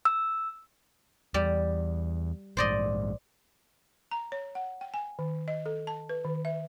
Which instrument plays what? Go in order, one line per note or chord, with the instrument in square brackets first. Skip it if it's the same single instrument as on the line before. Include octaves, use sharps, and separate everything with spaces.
[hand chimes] E6
[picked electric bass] E2 [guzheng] G3 D5
[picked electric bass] A#1 G#2 [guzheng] C5 D5 D#5
[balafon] A#5
C#5
F#5
G5
G#5
D#3
D#5
A4
A5
B4
D#3
E5